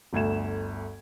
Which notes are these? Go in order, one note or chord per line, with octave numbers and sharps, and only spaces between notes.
G1 D2 G#6 E7